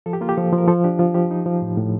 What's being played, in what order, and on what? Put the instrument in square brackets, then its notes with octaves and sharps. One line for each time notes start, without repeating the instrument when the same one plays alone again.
[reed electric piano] F3 A4
G4
A#3 F4
G4
F3 A4
F3
A#4
F3 A4
D4 G4
F3 F4
F3 G4
D#4
F3
A2
A2